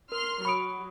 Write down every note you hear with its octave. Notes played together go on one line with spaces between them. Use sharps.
A#4 C6 F6
F#3 B5 C#6 D#6 C#7 D7